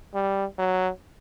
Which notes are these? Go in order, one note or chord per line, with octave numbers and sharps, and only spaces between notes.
G3
F#3